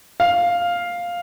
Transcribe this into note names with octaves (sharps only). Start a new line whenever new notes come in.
F5